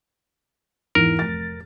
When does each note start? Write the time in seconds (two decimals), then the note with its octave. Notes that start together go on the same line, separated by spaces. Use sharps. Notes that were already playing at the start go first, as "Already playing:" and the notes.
0.95 E2 G#2 E3 A#4
1.19 F1 A6